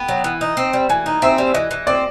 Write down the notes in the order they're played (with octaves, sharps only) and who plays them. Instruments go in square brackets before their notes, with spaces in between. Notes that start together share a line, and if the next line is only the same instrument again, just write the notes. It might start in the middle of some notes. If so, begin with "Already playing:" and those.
Already playing: [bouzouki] B3 [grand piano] G5
[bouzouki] F#3
E3
D#4
C4
G3
[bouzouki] E3 [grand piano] G#5
[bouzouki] D#4
[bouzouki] C4 [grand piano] E5
[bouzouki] G3
[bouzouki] E3 [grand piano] D#5
[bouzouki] E3
[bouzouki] C4 [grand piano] D5